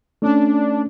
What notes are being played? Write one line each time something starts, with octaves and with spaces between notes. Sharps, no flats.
A3 C#4 D4